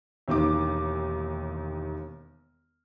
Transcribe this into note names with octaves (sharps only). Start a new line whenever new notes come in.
E1 D#2 D#4 D6